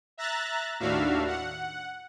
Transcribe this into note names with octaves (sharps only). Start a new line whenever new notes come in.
E5 A#5 F#6 A6
D#2 A2 D4 F#4 E5 F5
F#5